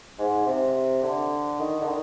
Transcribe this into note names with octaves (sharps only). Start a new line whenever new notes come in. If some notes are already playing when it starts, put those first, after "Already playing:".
G#2
C3
D3
D#3
D3
D#3